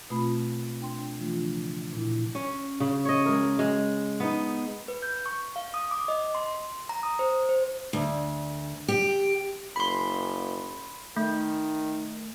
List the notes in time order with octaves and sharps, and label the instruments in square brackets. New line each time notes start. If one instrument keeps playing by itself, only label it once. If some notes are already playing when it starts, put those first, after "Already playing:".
[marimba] B2 A3 C4 F4 B5
D4 G5 C6
E3 F3 A3 D4 F4
C#3
A#2 E4
[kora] C#4
C#3
C#5 D#5
G#3 A#4
G#3
B3 D#4
[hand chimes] B4
G6
C#6
F5
D#6
D6
D#5
C6
A#5
D#6
C5
C5
[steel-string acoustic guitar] D2
G4
[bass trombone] F#1 [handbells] B5 C6
[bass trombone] D#3 [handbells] A3